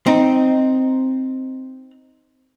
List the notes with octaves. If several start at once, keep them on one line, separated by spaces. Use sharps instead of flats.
C4 D#4